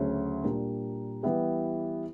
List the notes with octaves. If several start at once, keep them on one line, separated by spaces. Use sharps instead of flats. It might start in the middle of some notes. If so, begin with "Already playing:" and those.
Already playing: D2 C#3 F#3 A3 C#4
A#2 G3 A#3 D4
E3 G3 B3 E4 G4